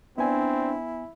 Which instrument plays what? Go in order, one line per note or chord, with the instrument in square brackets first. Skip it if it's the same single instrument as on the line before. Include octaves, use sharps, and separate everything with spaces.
[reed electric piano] B3 G#5 [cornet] C4 [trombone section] D4 [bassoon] E4